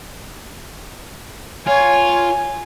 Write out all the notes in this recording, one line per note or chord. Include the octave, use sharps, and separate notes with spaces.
F4 C#5 G#5